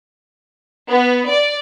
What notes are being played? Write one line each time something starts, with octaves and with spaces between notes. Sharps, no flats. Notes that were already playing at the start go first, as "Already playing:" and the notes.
B3
D5